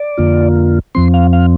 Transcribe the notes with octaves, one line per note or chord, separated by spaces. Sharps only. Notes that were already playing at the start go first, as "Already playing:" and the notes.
Already playing: D5
F2 D3 A#3 F4
F2 F3 C4 C6
F5
F5